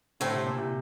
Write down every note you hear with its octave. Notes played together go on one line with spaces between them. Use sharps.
A2 D3 A3 C4
C3
A#2
C3